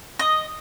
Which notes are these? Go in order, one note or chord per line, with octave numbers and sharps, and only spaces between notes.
D#5